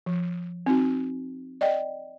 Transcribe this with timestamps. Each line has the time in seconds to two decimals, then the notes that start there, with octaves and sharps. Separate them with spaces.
0.06 F3
0.66 C4 D#4 F#4
1.61 D5 D#5 G5